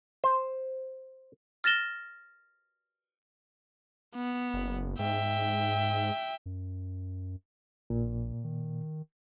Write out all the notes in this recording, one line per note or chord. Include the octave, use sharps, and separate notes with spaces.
C5
F6 A6 A#6 E7 G7
B3
F#1
G#2 E5 G5
F#2
A#1 A#2
D#3